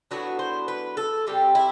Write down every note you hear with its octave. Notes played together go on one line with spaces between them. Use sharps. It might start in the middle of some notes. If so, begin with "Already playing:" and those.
A2 F#3 B3 D4 F#4
C5
B4
A4
C3 G3 C4 G4
E4